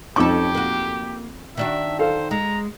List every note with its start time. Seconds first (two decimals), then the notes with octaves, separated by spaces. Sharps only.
0.16 F2 C#4 D#4 G4 A4 D6
0.54 A#3 F#4
1.57 D#3 D4 F#4 E5
1.99 A4 C5 F5
2.31 G#3 A#5